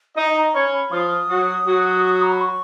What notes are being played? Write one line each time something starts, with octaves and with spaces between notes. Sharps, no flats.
D#4 D#5 A#5
A#5
C#4 C#5 B5
B5
F3 F4 D#6
F#3 F#4
F#3 F#4
D#6
D#6
A#5
B5
C#6